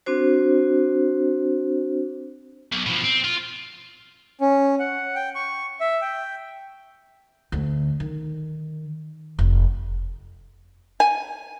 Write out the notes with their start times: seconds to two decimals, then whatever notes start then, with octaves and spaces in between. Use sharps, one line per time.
0.06 C4 D4 F#4 C5
2.72 B1
2.87 B2 F3
3.04 C4
3.24 F4
4.41 C#4
4.80 F#5
5.15 G5
5.35 C#6
5.81 E5
6.02 G5
7.52 D2
8.00 D#3
9.39 F1
11.00 G#5